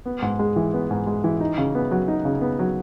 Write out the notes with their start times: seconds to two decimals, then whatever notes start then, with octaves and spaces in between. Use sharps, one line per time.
0.06 B3
0.22 G#2
0.39 G#3
0.56 E3
0.74 B3
0.91 G#2
1.07 G#3
1.24 E3
1.41 D#4
1.58 C#3
1.75 B3
1.91 F#3
2.08 D#4
2.25 C#3
2.41 B3
2.59 F#3